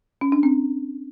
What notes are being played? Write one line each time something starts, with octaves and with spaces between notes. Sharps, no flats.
C#4
D4
C4